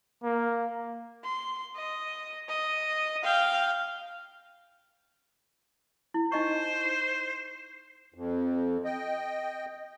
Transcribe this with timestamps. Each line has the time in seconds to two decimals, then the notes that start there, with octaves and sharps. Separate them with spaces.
0.24 A#3
1.24 C6
1.76 D#5
2.48 D#5
3.24 F5 G5
6.14 E4
6.32 D#4 C5 D#5 C#6
8.14 F2
8.85 D#5 G5